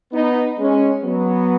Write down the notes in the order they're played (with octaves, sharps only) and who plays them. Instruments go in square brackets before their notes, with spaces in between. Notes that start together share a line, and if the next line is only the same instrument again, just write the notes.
[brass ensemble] B3 D#4
G#3 C#4
F#3 B3